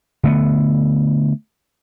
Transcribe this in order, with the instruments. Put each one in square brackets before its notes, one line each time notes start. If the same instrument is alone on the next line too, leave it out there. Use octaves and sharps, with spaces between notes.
[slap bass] D3 A3 B3